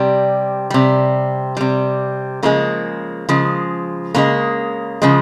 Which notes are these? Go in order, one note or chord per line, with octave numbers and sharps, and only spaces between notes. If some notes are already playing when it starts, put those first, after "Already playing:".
Already playing: C3 G3
C3 G3
C3 G3
C#3 F3 G#3 A#3
C#3 F3 G#3
C#3 F3 G#3 A#3
C#3 F3 G#3